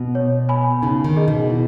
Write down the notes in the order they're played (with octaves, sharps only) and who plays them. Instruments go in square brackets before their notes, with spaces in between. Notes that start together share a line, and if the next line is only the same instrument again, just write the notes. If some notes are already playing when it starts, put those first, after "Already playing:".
Already playing: [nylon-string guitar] B2
[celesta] C#5
G#5 B5
[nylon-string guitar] C#3 [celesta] D#4
[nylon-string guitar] D#3
[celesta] G#4 D#5
[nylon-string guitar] B2
[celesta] E4